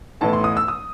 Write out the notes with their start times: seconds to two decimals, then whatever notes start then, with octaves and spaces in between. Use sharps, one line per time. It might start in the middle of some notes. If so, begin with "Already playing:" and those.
0.21 A1 A2 E3 B3 E4 A5
0.33 C6
0.44 D#6
0.57 E6
0.68 D#6